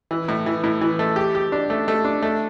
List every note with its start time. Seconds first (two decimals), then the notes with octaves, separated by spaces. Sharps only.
0.11 E3
0.28 A2
0.46 E3
0.64 A2
0.81 E3
0.99 A3
1.16 G4
1.35 G4
1.52 D4
1.70 A3
1.88 A3
2.05 D4
2.23 A3